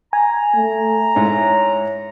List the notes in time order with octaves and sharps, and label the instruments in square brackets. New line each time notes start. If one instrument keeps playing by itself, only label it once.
[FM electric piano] G#5 [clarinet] A#5
[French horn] A3
[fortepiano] G#2 E4 [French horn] C#5